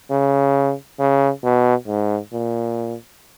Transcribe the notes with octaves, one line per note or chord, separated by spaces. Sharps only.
C#3
C#3
B2
G#2
A#2